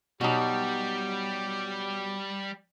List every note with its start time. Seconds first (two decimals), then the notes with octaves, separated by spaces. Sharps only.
0.21 B2 F#3 G3 D#4 F#4 G4